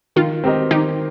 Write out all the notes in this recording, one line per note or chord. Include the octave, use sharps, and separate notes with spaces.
D#3 F4
C4 G4 A#4 D#5
D#3 D#4 G4